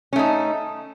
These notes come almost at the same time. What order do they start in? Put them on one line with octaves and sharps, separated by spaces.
C#4 A3 D#4